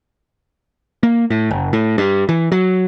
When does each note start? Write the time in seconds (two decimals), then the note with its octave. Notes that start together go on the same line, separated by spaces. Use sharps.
1.03 A#3
1.30 A2
1.51 F#1
1.73 A2
1.98 G2
2.29 E3
2.52 F#3